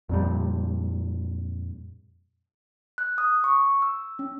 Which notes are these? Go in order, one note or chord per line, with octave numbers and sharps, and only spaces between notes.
F2 A#2 G3
F#6
D#6
C#6
E6
C#4